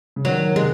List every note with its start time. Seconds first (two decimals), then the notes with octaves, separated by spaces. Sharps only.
0.16 C#3
0.25 D#3 F#3
0.40 D#3
0.55 C3 G#3